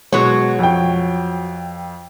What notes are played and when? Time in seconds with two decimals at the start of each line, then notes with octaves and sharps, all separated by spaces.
0.12 B2 F#3 G#3 C#5
0.59 F2 G5